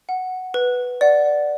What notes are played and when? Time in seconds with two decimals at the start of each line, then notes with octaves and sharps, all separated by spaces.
0.09 F#5
0.54 B4
1.01 D5 F#5